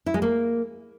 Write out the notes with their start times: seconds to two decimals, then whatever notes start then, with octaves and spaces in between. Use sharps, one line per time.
0.06 E4
0.14 G#3
0.22 A#3